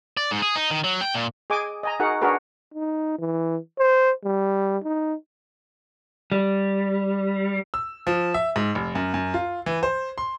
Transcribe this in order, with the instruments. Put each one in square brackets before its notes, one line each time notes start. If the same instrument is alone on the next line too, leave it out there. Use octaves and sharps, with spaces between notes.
[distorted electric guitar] D5
G#2
G#4
D#4
D#3
F#3
G5
A#2
[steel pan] G#4 D#5 G#5 D6
D#5 G#5 A#5
D#4 F#4 G#4 A#4 F#5
D4 F#4 G#4 A#4 B4
[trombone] D#4
E3
C5
G3
D#4
[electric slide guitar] G3
[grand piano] E6
F3
E5
G#2
F1
F#2
F#2
F4
E3
C5
C6